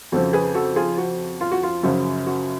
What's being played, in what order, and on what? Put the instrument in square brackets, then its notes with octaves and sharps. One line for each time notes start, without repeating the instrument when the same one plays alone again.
[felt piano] F2 C#3 F3 F#4 A4
G#4 B4
F#4 A4
F4 G#4
F#4
F4
F#4
F4
F#2 C#3 F3 F#4
F#4